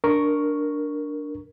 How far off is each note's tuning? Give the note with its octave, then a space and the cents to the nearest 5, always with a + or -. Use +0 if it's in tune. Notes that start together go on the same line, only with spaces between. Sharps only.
D4 +0 A#4 +0 C#6 +0